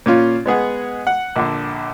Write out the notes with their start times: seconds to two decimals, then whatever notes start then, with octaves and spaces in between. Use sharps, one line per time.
0.06 A#2 C#4 F4
0.46 G#3 B3 G#4 F#5
1.07 F#5
1.36 A#1 D3